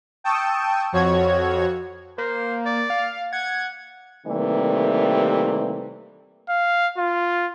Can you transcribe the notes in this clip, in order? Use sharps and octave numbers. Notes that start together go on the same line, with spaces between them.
G5 A5 C#6 D#6 E6
F2 F#4 C#5 G#6
A#3 C5
D5
F5
F#5 G#6
C3 D#3 E3 G3 A3 A#3
F5
F4